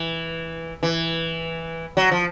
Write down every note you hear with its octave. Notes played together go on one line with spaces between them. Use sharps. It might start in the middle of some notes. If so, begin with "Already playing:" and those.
Already playing: E3
E3
F#3
F3